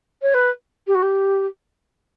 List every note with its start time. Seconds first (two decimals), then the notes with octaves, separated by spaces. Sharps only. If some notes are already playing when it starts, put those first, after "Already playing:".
0.22 C#5
0.34 B4
0.87 G4
0.95 F#4
1.02 G4